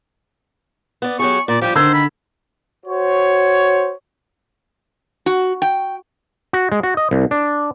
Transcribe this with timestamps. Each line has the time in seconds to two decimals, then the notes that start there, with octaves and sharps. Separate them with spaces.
1.02 B3 D5
1.19 F#3 G4 G#4 C#6
1.48 A#2 D5
1.61 F3 G3 G4
1.75 D3 D#3 C5 E6 G#6
1.94 B5
2.86 F#4 C5 C#5
5.26 F#4
5.62 G5
6.53 F#4
6.72 G#3
6.83 F#4
6.97 D#5
7.11 C2
7.31 D4